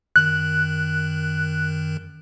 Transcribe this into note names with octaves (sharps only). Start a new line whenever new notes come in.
F#2 D#3 F#6